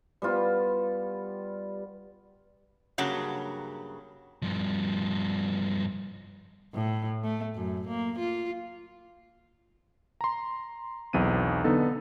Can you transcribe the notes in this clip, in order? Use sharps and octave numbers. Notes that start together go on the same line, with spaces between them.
G3 B3 F4
G2 C#3 F#3 A#3 F#5 A5
G2 F3
A2
A3
F#2
A#3
F4
A#5 C6
B1 E2 C4 D#7
D3 B3 D#4 A4